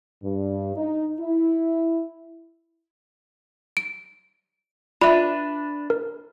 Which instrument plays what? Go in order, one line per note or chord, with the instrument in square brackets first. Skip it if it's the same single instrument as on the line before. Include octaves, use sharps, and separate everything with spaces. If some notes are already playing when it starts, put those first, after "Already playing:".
[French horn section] G2
D#4
E4
[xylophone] D7
[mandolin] D4 B4 [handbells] F4 D5 [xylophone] E5 B5
[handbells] A#4